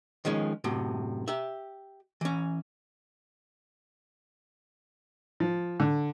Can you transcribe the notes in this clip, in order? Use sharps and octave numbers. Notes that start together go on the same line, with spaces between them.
D#3 F3 G#3 C#4
F#2 A2 C3
G4 E5
E3 C#4
F3
D3